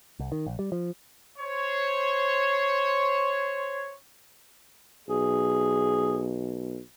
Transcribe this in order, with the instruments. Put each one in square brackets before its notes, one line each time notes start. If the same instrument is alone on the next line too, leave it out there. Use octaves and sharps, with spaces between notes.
[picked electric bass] C2
D#3
A#1
G3
F3
[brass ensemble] C5 C#5
[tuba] B1 [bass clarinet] G#4